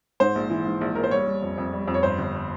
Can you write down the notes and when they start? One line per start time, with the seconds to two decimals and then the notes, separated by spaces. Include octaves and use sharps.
0.20 G#2 C5
0.35 A#1
0.50 E3
0.66 G#2
0.81 A#1
0.95 A#1 A#4
1.04 C5
1.11 G3 C#5
1.26 G3
1.42 F2
1.58 F2
1.73 G3
1.88 F2
1.94 C#5
2.03 G2 C5
2.19 G1